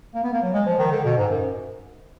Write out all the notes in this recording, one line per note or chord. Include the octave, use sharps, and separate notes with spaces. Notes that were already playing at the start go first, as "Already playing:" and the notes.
A#3
B3
A#3
F#3
G#3
F3
D#3
D3
B2
G#2
F#2